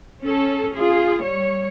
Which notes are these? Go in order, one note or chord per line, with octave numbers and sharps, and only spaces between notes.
C#4 A4
F4 G#4
G3 C#5